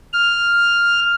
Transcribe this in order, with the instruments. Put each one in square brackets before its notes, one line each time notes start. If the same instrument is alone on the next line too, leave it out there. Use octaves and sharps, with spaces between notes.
[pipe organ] F6